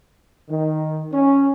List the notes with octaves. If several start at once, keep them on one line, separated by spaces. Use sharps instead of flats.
D#3
C#4